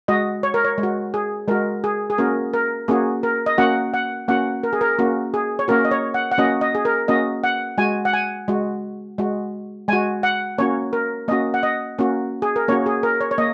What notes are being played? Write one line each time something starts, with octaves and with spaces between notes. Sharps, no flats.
G#3 F#4 D#5
C#5
A#4
C#5
G#3
F#4
G#4
G#3 F#4 A#4
G#4
G#4
A#3 C#4 F#4 A#4
A#4
A#3 C#4 F#4 G#4
A#4
D#5
A#3 C#4 F#4 F#5
F#5
A#3 C#4 F#4 F#5
A#4
G#4
A#4
A#3 C#4 F#4
G#4
C#5
A#3 C#4 F#4 A#4
D#5
C#5
F#5
F#5
A#3 C#4 F#4 D#5
D#5
G#4
A#4
A#3 C#4 F#4 D#5
F#5
G#3 F#4 G#5
F#5
G#5
G#3 F#4
G#3 F#4
G#3 F#4 G#5
F#5
A#3 C#4 F#4 C#5
A#4
A#3 C#4 F#4 D#5
F#5
D#5
A#3 C#4 F#4
G#4
A#4
A#3 C#4 F#4 C#5
G#4
A#4
C#5
C#5
A#3 D#5